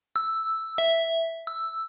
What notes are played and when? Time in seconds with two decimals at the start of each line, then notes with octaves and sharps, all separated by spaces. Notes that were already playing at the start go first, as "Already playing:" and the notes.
0.16 E6
0.78 E5
1.47 E6